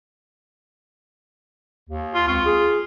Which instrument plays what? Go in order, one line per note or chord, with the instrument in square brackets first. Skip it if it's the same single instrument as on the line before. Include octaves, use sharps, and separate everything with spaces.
[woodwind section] D#2
[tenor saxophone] F4
[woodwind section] C#2 C4 C#6 [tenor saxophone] F4
[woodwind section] G#4